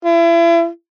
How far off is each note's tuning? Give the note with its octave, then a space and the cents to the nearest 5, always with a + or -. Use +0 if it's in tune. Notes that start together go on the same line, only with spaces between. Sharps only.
E4 +35